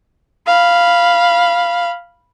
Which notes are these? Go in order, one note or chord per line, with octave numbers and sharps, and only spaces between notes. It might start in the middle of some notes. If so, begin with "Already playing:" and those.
F5 B5